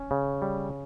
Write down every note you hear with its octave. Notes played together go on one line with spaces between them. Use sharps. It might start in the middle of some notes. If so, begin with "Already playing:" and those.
Already playing: C#4
C#3
G3